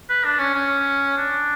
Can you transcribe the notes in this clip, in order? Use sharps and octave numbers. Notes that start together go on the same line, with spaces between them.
B4
D4
C#4
C#4
D4